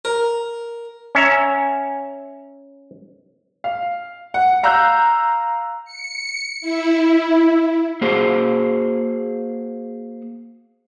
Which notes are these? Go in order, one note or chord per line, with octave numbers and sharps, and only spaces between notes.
A#4
C#4 E5 A#5
F5
F#5
F5 A#5 E6 F#6 G6
C#7
E4
A#3 F#4 G#4 C5